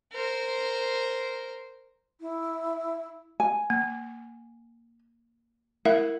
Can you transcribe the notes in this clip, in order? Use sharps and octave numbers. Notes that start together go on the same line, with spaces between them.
A#4 C5
E4
G#5
A#3
E4 A#4 E5 F#5